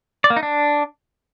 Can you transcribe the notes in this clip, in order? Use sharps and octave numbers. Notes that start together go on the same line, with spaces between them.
D5
A#3
D#4
D4